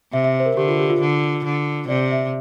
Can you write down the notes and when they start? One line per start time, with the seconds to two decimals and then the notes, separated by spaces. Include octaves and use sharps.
0.13 C3 E5
0.24 E5
0.40 C5
0.46 A#4
0.57 D3 G4
0.68 F4
0.79 G4
0.90 F4
1.01 D3
1.44 D3
1.88 C3 D5
2.11 E5